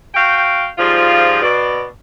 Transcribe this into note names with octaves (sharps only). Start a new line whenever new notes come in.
F#4 F5 G5
G#2 F3 G3 F4
B2 D5